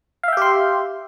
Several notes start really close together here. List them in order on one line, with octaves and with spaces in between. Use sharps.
F5 E5 G5 G4 C6